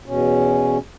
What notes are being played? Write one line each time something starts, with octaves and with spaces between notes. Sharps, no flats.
E2 B2 C#4